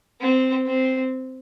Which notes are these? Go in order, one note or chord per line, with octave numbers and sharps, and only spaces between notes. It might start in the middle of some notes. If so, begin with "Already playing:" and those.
C4
C4